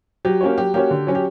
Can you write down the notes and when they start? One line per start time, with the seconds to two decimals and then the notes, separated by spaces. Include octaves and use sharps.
0.25 F#3 G4
0.41 A#3 C#4 F#4 C#5
0.58 F#3 G4
0.74 A#3 C#4 F#4 G4 C#5
0.91 D3
1.07 F#3 C#4
1.15 G4